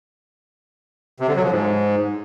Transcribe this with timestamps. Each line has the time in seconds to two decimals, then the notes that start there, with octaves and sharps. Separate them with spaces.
1.20 C3
1.28 D3
1.36 F#3
1.44 F3
1.52 G#2